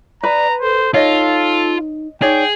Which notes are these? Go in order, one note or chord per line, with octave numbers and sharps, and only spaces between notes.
B4 D5 A#5 B5
A4 C5
D#4 F4 A4 C#5 D#5
D#4 G#4 C#5 D5 G5